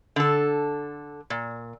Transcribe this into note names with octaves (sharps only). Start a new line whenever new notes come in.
D3 A4
A#2